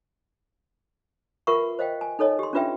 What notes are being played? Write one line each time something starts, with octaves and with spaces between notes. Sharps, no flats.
F4 A#4 B4 E5 F#5 C#6
C5 D#5 F5 G5
G#5
D#4 A4 C#5 D#5
G4 C6
C#4 D4 F4 B4 E5 G5